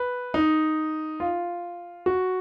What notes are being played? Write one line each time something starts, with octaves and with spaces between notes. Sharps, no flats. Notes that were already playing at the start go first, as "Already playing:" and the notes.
Already playing: B4
D#4
F4
F#4